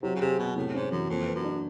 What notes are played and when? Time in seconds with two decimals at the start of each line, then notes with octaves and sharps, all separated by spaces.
0.03 C3 F#3
0.15 C#3
0.21 C3 G#4
0.39 B2 B3
0.56 A2 C3
0.74 G#2 C#4
0.91 F#2 E3
1.09 F2 A#3
1.27 B4
1.35 F#2
1.44 D4